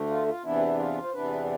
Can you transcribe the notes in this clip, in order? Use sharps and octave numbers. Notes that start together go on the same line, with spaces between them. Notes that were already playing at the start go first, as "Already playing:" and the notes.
Already playing: D2 D3 A3
F4
F4
E2 C3 E3 B3 D4 E4
F4
C5
E2 C3 E3 B3 D4 B4